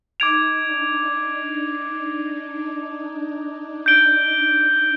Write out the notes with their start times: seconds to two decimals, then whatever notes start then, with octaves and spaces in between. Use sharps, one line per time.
0.20 D#4 D6 G#6 D7 F7
0.66 D4
1.12 D#4
3.86 G6 D7 G7